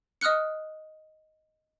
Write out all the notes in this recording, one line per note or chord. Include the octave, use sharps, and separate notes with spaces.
D#5 D#6 F6 F#6 C#7